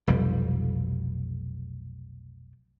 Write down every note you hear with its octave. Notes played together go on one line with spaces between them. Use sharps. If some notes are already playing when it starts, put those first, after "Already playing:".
F1 B1 F2 G3